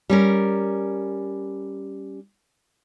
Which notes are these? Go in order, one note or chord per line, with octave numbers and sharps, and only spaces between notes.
G3 C#4 A#4